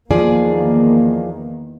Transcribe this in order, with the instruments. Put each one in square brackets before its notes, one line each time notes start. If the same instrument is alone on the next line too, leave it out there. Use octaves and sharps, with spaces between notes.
[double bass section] E2 D#3 A#3 [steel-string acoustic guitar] F3 G#4 D5